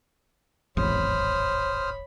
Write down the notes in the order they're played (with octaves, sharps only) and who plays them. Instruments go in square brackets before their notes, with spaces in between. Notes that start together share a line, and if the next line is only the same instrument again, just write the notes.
[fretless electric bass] D1 G#1 E2 [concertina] C5 D#6 F6 [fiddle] C#5 B5